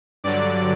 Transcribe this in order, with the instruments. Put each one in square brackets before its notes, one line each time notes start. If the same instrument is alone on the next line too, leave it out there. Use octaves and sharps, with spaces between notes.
[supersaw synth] G2 D3 F#3 D5